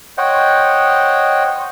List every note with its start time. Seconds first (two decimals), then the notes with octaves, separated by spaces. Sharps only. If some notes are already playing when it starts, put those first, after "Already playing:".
0.18 C5 C#5 D#5 F#5 G5